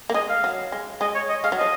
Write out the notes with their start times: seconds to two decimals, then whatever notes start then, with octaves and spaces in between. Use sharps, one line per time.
0.10 A#3
0.14 G#3 D#5
0.29 F5
0.44 F#3
0.72 G#3
1.01 G#3 D#5
1.15 C#5
1.29 D#5
1.44 G#3 F5
1.52 F#3
1.58 F3 D#5